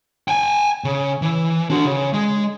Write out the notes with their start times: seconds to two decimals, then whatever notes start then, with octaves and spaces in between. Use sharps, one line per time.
0.28 G5 G#5
0.84 C#3
1.22 E3
1.70 D4 F#4
1.85 C#3
2.13 G#3